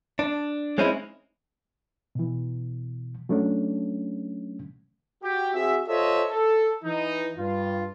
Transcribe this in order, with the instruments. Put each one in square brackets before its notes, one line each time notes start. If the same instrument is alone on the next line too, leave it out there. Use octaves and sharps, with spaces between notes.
[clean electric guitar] D4
G#3 C4 C#4 D#4 E4
[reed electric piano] B2 E3
F#3 A3 C#4 D4
[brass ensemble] F#4 G4
C4 F#4 G#4 E5
F4 A4 C5 C#5 D#5 E5
A4
E3 D#4
G2 F4